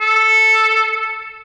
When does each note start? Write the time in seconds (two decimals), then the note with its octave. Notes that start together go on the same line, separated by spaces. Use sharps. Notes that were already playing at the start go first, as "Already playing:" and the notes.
0.01 A4